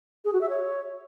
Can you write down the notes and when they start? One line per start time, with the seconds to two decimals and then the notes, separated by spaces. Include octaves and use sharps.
0.25 G#4
0.33 F#4
0.41 E5
0.49 C#5